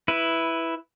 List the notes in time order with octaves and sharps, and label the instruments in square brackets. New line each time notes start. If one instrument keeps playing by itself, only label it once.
[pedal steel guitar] E4 B4